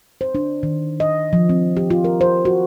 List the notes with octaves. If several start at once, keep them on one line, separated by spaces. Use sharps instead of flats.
C5
D4
D#3
D#5
F3
C4
G4
F4
A#4
C5
F#4